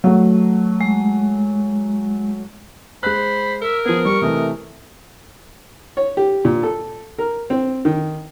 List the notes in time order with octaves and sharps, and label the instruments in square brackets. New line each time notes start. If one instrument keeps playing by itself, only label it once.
[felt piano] F#3 A3
[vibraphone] G#3
[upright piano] G#3 F#6 [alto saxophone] C5 [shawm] B5
[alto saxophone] A#4 [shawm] E5
[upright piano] F3 B3 [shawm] G#4
[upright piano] G3 [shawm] C#6
[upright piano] C3 E3 A3 [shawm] D#5
[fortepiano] C#5
G4
A#2
A4
A#4
C4
D#3